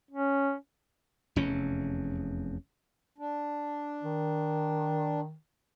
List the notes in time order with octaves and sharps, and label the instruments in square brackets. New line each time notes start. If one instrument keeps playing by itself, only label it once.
[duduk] C#4
[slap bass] F1 E2 C#4
[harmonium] D4
[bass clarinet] D#3